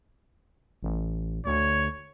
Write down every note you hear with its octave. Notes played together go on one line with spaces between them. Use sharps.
A1
D2 C#5